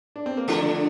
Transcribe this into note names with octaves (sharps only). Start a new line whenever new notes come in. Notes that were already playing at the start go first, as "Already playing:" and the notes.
D4
C4
A#3
D3 F3 A3 D4